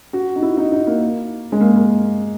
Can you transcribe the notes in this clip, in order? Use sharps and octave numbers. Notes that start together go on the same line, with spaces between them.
F#4
D#4
E4
D#4
D#4
A#3
G#3
A#3
A#3